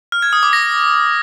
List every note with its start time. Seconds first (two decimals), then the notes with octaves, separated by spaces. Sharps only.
0.12 F6
0.22 G#6
0.33 D#6
0.43 D6
0.53 A#6